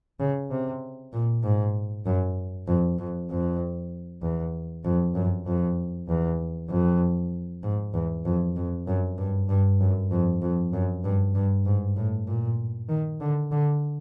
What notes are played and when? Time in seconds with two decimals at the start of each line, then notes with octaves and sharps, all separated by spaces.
0.20 C#3
0.51 C3
1.13 A#2
1.44 G#2
2.06 F#2
2.67 F2
2.99 F2
3.30 F2
4.23 E2
4.85 F2
5.16 F#2
5.46 F2
6.09 E2
6.70 F2
7.64 G#2
7.94 E2
8.25 F2
8.56 F2
8.87 F#2
9.18 G2
9.49 G2
9.81 F#2
10.11 F2
10.42 F2
10.73 F#2
11.04 G2
11.35 G2
11.66 G#2
11.97 A2
12.28 A#2
12.89 D#3
13.21 D3
13.52 D3